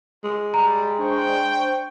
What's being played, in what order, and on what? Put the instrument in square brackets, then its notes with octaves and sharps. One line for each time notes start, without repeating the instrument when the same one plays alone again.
[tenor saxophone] G#3
[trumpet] G3 [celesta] A#5
[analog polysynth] D4 C5 C#6 [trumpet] G5